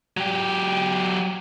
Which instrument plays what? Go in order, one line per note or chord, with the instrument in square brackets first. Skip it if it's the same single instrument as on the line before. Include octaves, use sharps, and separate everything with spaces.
[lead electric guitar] F#3 G4